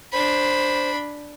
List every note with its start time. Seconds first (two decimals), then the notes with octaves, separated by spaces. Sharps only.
0.13 D4 C5 B5